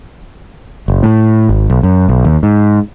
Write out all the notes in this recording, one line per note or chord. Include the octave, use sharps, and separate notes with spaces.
F#1
A2
G#1
B1
F#2
B1
D#2
G#2